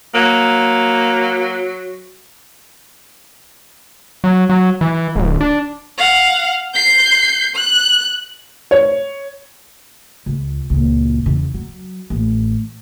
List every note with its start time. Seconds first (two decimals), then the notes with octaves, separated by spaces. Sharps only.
0.15 F#3 A#3
4.24 F#3
4.50 F#3
4.81 E3
5.16 D1
5.41 D4
5.98 F5 F#5
6.74 G6 C7
7.56 F#6
8.71 C#5
10.26 C#2
10.70 C#2 A#2
11.26 E2 C#3
11.54 F#3
12.10 A1